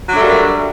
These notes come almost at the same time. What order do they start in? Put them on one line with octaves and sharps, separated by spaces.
F#3 D4 A3 G3 A#3